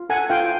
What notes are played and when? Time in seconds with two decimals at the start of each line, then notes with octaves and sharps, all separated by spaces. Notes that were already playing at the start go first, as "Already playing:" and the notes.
Already playing: F4
0.09 A4 F#5 G#5
0.30 F4 F5 G5